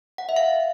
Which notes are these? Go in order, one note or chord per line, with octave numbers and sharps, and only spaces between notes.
F#5
E5
F5